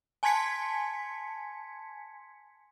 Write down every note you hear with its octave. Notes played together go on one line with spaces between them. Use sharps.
G#5 A5 C6 G#6 B6 C#7